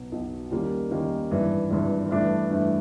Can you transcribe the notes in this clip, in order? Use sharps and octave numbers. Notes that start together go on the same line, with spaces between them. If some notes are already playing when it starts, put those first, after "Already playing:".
Already playing: B1 B2 F#3
B1 B2 F#3
D#2 D#3 G3 A#3 C#4
D#2 D#3 G3 A#3 C#4
G#1 G2 E3
G#1 G2 E3
G2 E3 A3 D4
G2 E3 A3 D4